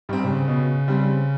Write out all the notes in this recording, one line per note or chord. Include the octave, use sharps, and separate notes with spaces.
G#2 G3 C4
C3
C#3
B2
G3 C4